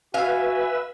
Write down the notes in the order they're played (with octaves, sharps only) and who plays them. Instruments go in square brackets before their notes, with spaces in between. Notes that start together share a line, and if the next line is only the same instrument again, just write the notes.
[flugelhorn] F#4 [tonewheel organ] B4 E5 [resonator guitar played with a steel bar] F5 [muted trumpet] G#5